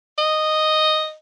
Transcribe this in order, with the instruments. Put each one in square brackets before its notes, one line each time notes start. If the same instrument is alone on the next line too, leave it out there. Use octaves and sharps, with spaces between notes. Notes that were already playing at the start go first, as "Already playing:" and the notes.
[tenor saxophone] D#5